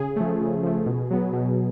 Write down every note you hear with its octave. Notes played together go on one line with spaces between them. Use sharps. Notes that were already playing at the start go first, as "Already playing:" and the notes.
Already playing: C#3 G#4
F3 A3
C#3
F3 A3
B2
F#3 B3
B2